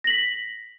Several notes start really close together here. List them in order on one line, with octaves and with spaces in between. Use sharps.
A#6 F#7 B6